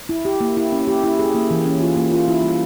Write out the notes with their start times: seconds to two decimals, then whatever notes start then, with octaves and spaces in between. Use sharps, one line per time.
0.09 E4
0.25 G4
0.40 A#3
0.57 E4
0.72 C#4
0.87 G4
1.04 E4
1.19 G#4
1.35 A#3
1.51 E3
1.66 C#4
1.81 F4
1.96 A#3
2.12 F4
2.28 E4
2.44 G3